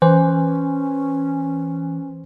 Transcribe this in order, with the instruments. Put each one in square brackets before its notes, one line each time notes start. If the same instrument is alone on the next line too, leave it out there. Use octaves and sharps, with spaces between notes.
[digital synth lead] E3 [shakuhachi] C#4 [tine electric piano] C5